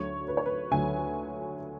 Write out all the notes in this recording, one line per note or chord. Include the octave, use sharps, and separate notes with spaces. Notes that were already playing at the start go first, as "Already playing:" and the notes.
Already playing: D2 D3 F#3 C#5
B4
C#5
B4
D2 D3 F#3 G#5